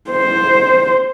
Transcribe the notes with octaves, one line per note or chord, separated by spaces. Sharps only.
C5